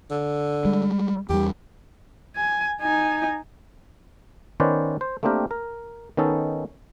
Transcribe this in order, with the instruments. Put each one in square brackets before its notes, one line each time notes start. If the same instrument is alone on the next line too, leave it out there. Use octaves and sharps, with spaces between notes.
[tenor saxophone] D3
[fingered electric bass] G3 G#3
[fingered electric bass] E2 G3 [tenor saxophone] G4
[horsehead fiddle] G#5
D#4 G#5
[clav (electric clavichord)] D#3 B3 C#4 B4 C5 D5
C5
A3 A#3 C4 D4 G4 A#4
A#4
D#3 B3 C#4 D#4 A4